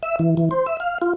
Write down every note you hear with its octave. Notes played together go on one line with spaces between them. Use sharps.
E5
E3
E3
C5
E5
F5
F4